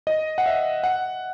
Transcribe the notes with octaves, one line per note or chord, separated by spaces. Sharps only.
D#5
F#5
E5
F#5